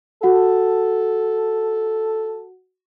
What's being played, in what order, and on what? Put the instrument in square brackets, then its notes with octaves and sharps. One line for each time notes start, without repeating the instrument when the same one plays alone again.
[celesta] F#4 F#5 [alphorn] A4